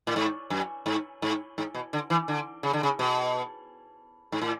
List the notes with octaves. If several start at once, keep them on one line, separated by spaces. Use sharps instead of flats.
A2
G#2
F#2
G#2
G#2
G#2
B2
D3
E3
D3
C#3
D3
C#3
B2
G#2
A2